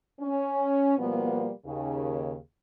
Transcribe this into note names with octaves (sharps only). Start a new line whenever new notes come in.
C#4
B2 F3 G3 A#3 B3
D#2 C#3